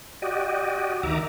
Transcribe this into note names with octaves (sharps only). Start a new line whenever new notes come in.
F#4 G4 D5 D#5
D2 D#3 E5 A#5 D6